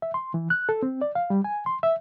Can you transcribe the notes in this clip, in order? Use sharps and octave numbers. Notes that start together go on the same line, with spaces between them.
E5
C6
E3
F#6
A4
C4
D5
F5
G3
G#5
C6
E5